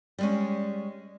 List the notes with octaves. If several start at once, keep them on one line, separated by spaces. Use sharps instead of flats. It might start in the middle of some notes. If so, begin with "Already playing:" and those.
G3 G#3 C#4